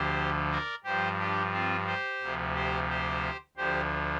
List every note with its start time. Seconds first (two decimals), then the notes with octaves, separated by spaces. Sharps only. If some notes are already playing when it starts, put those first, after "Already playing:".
Already playing: D2 D3 F3 G4 C5
0.51 A#4 D5
0.84 G2 F3 G4 C5
1.19 D4 G4
1.52 C4 F4
1.86 G4 C5
2.21 D2 C3 F3
2.54 G4 C5
2.89 G4 C5
3.57 D2 D3 F3 G4 C5